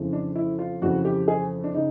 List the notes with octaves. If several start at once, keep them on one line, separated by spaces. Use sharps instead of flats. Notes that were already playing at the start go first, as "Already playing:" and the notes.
Already playing: F2 C#3 E3
D4
E4
F4
F2 C#3 E3 F#4
G4
G#4
D4
C#3 D#4